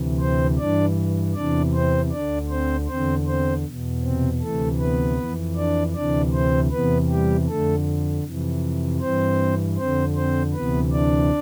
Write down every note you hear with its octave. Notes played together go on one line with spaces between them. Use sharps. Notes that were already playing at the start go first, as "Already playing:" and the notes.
Already playing: D2 C3 E3
C4 C5
G2 E3 D4 D5
E2 C3 E3 D4 D5
C4 C5
D2 D3 D4 D5
C4 C5
E2 D3 C4 C5
C4 C5
E2 B2
C3 C4
D2 C3 E3 A3 A4
B3 B4
F2 E3
D4 D5
D2 C3 E3 D4 D5
C4 C5
E2 C3 E3 B3 B4
G3 G4
F2 D3 A3 A4
F2 C3 E3
G2 E3 C4 C5
F2 D3 C4 C5
C4 C5
D2 C3 E3 B3 B4
D4 D5